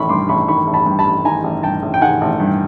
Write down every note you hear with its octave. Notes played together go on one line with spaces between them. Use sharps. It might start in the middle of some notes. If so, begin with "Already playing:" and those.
Already playing: A1 D#3 B5 C#6
G2 C6 D6
A1 B5 C#6
D#3 B5 C#6
A1
A5 B5
G2
A5 B5
A1
D#3 G#5 A#5
A1
G2 G5 A5
A1
G5
D#3 F#5 G#5
A1
G2